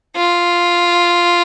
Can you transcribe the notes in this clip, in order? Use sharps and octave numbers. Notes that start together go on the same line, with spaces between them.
F4